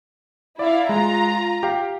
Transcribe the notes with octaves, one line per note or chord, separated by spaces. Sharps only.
E4 D5 F5
G#3 F4 A#5
G4 F5